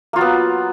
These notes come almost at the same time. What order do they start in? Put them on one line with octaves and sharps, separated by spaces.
A#3 F4 F#3 B3